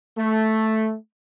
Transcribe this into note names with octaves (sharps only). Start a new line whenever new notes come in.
A3